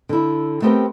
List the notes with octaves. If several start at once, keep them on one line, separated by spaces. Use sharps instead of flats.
D3 E4
A3 B3 C4 G4 G#4 A#4